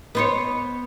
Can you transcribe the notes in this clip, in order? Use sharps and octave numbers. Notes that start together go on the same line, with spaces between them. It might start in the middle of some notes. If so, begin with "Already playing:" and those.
B3 C5 C#5